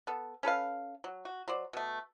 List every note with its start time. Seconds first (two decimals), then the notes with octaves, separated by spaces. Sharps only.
0.07 B3 A4
0.43 C#4 A4 B4 F5
1.04 F#3
1.25 F#4
1.48 F#3 C5 D5
1.73 B2 A3